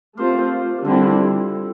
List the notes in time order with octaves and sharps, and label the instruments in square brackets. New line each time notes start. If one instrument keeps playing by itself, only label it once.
[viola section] A3 C4 F4 C5 [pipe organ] G4 A#4
[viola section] D3 G3 C4 E4 [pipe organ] F4 A4